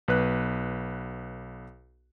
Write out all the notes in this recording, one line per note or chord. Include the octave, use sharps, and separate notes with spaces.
B1 B3 B4 F#6